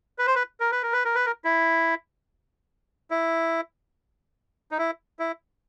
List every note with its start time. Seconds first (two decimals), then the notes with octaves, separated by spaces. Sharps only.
0.19 B4
0.27 C5
0.35 B4
0.60 A#4
0.72 B4
0.83 A#4
0.93 B4
1.05 A#4
1.15 B4
1.26 A#4
1.44 E4
3.11 E4
4.72 D#4
4.78 E4
5.19 E4